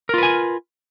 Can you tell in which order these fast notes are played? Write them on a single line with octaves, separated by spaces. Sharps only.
A#4 F4 B4 G#5